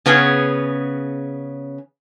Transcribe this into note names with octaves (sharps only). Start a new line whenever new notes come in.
C#3 B3 C#4 D4 G#4